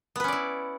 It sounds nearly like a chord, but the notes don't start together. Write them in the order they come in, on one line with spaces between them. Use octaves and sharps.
B3 B4 C#4 D5 E4